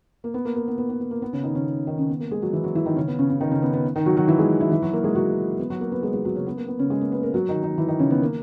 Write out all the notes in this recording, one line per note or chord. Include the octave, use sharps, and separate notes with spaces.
A#3
B3
A#3
A#3
B3
B3
B3
B3
A#3
B3
C#3 C#4
D#3 D#4
C#3 C#4
D#3 D#4
C#3 C#4
B3
A#3
G#3 G#4
F#3 F#4
E3 E4
F#3 F#4
E3 E4
D#3 D#4
C#3 C#4
B3
C#3 C#4
C#3 C#4
D#3 D#4
C#3 C#4
B3
B3
D#3 D#4
F#3 F#4
F#3 F#4
E3 E4
G#3 G#4
E3 E4
E3 E4
F#3 F#4
A#3 A#4
G#3 G#4
F#3 F#4
B3
F#3 F#4
A#3 A#4
B3 B4
G#3 G#4
G#3 G#4
F#3 F#4
C#3 C#4
B3
A#3
B3
C#3 C#4
G#3 G#4
A#3 A#4
B3 B4
A#3 A#4
F#3 F#4
D#3 D#4
D#3 D#4
E3 E4
D#3 D#4
C#3 C#4
B3
A#3